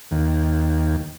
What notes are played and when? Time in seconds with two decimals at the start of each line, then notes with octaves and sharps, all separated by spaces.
0.11 D#2